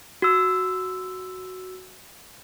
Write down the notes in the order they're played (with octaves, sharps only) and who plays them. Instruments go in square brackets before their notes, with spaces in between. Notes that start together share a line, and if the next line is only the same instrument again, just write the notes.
[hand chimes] F#4 E6